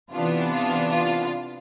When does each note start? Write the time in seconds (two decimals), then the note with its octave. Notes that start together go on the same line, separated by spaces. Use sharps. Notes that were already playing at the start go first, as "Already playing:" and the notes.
0.11 C3 E3 B3 D4 F4
0.51 F4
0.91 F4